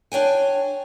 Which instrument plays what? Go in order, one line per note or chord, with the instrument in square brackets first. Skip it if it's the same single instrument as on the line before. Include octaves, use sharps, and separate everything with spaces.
[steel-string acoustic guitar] D4 C#5 G5 G#5